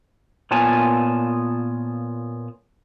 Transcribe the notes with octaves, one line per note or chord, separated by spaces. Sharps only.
A#2 B3 F4 C#5 G#5 A5